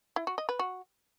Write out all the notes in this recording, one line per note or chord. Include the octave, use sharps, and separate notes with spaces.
E4
F#4
D#5
B4
F#4